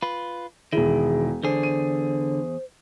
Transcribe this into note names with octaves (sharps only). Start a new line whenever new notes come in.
F4 B4
E1 D#3 E4 G#4
E2 D3 G#4 C5
D#7